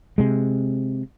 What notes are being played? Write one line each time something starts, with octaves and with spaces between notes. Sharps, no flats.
C3 G#3